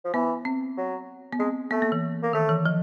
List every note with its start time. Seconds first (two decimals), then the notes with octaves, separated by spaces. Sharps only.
0.05 F3
0.14 E3 B3
0.45 C4
0.78 F#3
1.33 B3
1.39 G#3 C4
1.71 A3 B3
1.82 A#3
1.92 E3
2.23 A#3
2.33 D#3 A3
2.49 E3
2.66 F3